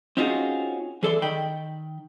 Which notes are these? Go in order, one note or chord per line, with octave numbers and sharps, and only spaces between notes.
C4 C#4 D#4 F4 F#4 G#4
E3 G#4 A4 D5 C6
D#3 G5 B5